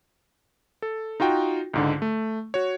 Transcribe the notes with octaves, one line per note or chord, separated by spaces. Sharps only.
A4
D#4 F4 F#4 G5
C#2 G#2 D3
A3
F#4 C#5